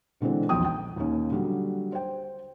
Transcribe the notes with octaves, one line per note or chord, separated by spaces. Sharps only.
B2 D3 E3 G#3 C4
E1 B1 F2 G5 D#6
G5
D#2 D#3 A#3 C#4
D3 F#3 G3
C5 G5